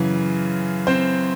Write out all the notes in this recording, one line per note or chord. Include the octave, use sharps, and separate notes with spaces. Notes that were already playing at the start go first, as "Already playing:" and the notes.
Already playing: F#2 C#3 E3
C4 C5